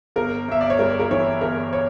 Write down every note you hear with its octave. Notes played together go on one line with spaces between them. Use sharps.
G1 A#4
G1 E5
D5
C#5
G2 A#4
A#4
E3 C#5
G1 A#4
C#5